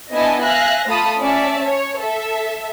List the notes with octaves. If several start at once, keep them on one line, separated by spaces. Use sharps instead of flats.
B3 D4 E4 D#5 G#5 A5
E5 F5 G#5 F#6 A#6
A3 F4 A5 B5 D#6
C#4 D5 E5 A5
C#5
A4 E5